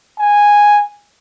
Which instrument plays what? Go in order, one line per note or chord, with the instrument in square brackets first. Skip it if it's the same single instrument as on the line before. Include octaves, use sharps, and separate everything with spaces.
[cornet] G#5